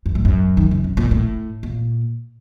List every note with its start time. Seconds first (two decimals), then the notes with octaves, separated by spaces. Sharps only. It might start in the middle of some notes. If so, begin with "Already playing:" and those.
0.06 F#2
0.15 A2
0.25 F#2
0.57 D#3
0.71 C#3
0.84 C3
0.97 A#2
1.11 A2
1.63 A#2